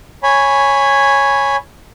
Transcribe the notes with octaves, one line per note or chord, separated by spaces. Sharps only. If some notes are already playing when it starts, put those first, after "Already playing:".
C#5 G#5 B5